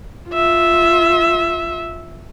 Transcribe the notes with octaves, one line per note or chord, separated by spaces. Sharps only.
F4 E5